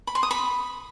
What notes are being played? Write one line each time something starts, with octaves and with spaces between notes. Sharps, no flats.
B5
C6
D#6
B5